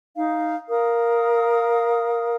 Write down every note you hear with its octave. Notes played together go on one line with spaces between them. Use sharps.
D#4 F5
A#4 F5 D#6